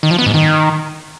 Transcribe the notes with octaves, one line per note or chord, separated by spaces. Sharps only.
D#3
F3
B3
G#2
D#3